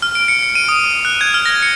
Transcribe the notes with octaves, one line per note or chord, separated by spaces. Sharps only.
F6
D7
C#7
C#7
D#7
D#6
D#6
F#6
G#6
F6
A#6
C#7